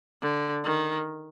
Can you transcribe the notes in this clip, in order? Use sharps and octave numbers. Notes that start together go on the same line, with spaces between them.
D3
D#3